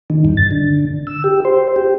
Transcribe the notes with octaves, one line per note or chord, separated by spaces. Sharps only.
D#3
G2
A6
D3
E6
G4
C5
G4